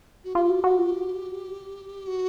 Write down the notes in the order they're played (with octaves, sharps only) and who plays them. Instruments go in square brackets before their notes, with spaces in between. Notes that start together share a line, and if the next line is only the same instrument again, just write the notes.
[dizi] F#4
[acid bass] F4 [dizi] G4
[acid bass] F#4
F#4
F4
F#4
[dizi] F#4